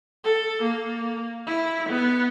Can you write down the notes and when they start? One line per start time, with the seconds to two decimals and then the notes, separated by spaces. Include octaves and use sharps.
0.24 A4
0.63 A#3
1.47 E4
1.89 B3